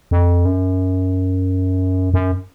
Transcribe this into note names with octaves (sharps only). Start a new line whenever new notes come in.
F2
F#2
F#2